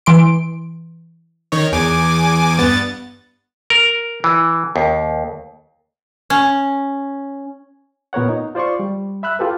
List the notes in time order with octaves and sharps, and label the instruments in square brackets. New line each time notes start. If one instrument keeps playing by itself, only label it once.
[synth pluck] E3 C6 D7
[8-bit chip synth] D#3 D#4 C#5
E2 G#5 D6
G2 B3 A6
[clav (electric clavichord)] A#4
E3
D#2
[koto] C#4
[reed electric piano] A#2 B3 A#4 C#5 F#5
D#4
F4 C5 D5 C6 C#6
G3
E5 B5 E6 F#6
F4 G4 A4 B4